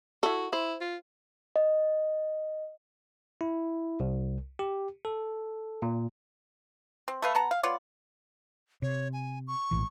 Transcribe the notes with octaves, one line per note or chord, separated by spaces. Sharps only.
E4 F#4 A4
E4 C5
F4
D#5
E4
C2
G4
A4
A#2
C4
A3 B4 F5
B3 F#5 A5 A#5
F5
B3 F4 C#5 D5
C3 C#5
G#5
C#6
A#1 A2 E3